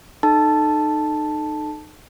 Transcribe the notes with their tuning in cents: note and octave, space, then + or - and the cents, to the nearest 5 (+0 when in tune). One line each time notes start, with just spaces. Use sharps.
D#4 -30 A4 -20 A5 +0